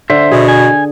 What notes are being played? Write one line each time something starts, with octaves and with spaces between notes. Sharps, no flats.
D3 C5 E5
B2 G#4
G#5